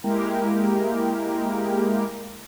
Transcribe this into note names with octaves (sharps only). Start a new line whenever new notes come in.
G#3 A#3 E4 G4 A#4